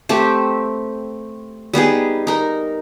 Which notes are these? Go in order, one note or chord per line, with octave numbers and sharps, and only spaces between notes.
A3 C4 G4
G3 B3 D#4 G#4
D#4 A#4